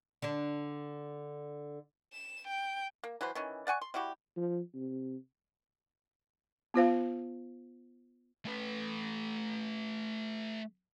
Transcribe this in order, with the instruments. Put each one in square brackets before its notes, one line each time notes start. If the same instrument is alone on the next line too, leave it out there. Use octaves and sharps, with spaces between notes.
[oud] D3 D4
[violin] E7
G5
[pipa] A#3
E3 F#3 B4 C5
D#3 E3 C#4
D5 F#5 G#5 C#6
C6
G3 E4 F#4 G4
[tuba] F3
C3
[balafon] B3 F4 C5 F5
[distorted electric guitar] A3 B4